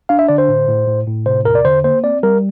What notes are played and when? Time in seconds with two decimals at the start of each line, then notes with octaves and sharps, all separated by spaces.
0.09 D4 F5
0.19 E5
0.28 D3 D5
0.38 C5
0.48 A2
0.68 A2
0.88 A2
1.07 A2
1.26 C3 C5
1.45 E2 A#4
1.55 D5
1.65 D3 C5
1.84 A#3 C5
2.04 C4 D5
2.23 G3 A#4